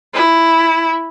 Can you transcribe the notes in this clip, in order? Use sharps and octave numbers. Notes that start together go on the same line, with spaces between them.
E4